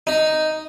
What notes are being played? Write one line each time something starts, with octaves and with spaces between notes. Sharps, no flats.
D#4